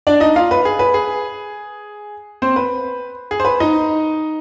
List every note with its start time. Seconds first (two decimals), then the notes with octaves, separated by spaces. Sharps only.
0.07 D4 D5
0.20 D#4 D#5
0.36 F4 F5
0.51 B4
0.65 G#4
0.79 B4
0.94 G#4
2.42 C4 C5
2.56 B4
3.31 G#4
3.40 C5
3.45 B4
3.60 D#4 D#5